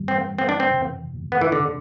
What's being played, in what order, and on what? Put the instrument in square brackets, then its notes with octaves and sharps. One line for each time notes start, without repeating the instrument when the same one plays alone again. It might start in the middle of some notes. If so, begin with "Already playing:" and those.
Already playing: [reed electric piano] G2 E3 G3
[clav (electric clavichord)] C4
C4
D4
C4
[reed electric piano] F2 C3 E3
[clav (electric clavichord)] B3
E3
D3